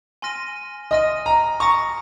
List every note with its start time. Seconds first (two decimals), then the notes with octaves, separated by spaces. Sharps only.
0.22 G#5 C6 F6 A#6 D#7
0.91 D#5 G#5 C6 F6 A#6 D#7
1.26 A#5
1.60 A#5 C#6 D#6 A#6